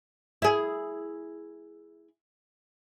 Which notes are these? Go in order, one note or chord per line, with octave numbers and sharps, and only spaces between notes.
E4 G#4